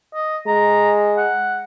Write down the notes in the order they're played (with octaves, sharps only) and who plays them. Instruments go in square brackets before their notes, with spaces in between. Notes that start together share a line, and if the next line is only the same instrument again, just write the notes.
[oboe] D#5
[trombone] G#3 [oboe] A#5
[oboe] F#5